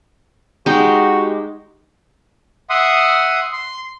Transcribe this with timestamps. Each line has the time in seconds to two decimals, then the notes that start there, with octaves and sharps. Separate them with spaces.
0.66 G#3 D#4 F#4 G4
2.70 E5 F#5 C6 D#6
3.53 C6